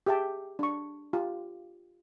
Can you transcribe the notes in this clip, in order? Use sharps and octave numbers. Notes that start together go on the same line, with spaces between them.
G4 G#4 E5 G5 A5
D4 C#6
F4 G4